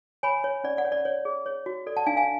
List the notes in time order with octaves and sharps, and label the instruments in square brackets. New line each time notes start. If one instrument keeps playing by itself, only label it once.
[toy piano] C#5 G#5 B5
C#5
C#4 D5
D5 F#5
C#5
D5
C#5
G#4
C#5
F#4
A4 D5
F#5 A5
D4 F5 G#5
F5 G#5